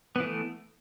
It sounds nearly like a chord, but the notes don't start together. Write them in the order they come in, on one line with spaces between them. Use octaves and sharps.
B3 E3 A3